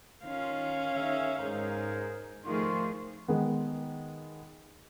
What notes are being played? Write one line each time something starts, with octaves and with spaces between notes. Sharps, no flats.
D#3 C#4 F4 F5
D#3 G#4 E5
G#2 D#4 G#4 A#4 C5
D#3 F3 A3 F4 G#4 C6 C#6
D#3 G#3 B3